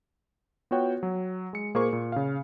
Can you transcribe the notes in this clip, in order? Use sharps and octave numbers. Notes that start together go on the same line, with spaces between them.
B3 F4 F#4 C#5 G5
F#3
G#3 C#7
A#2 A#3 G#4 A#4 C5 C#6
A#2
C#3 F5